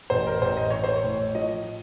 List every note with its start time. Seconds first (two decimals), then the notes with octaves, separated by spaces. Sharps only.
0.10 A1 C5
0.27 A#4
0.42 A1 C5
0.57 D#5
0.70 A1 C#5
0.84 C5
0.96 C#5
1.04 A2
1.35 F3 D#5